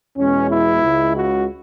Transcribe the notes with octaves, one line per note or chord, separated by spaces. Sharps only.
E2 B2 G#3 C#4
E4
C#2 C#3 G#3
F#4